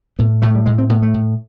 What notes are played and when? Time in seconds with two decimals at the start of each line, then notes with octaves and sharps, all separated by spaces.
0.19 A2 B3
0.42 A2 A3
0.55 G3
0.66 A2 G#3
0.78 C4
0.89 A2 B3
1.02 A3
1.14 A2